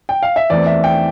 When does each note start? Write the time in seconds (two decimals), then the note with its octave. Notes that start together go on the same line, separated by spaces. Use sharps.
0.09 G5
0.22 F5
0.36 E5
0.50 E2 E3 A3 C4 D5
0.66 E5
0.84 G5